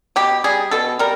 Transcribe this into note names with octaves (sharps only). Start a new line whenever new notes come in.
B2 G4
G3 G#4
B2 A4
G3 A#4